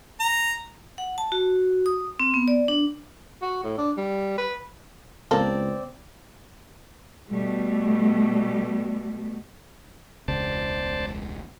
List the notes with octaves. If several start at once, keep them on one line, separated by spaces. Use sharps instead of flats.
A#5
F#5
A5
F#4
D#6
C4
B3
D5
D4
F#4
A2
D4
G3
B4
C#2 A#3 C4 A4 D5
B2 G3 A3
E1 C#2 C#3 C5 D5 A5